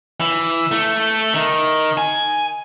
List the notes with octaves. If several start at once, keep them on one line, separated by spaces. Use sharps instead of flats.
E3
A3
D#3
G#5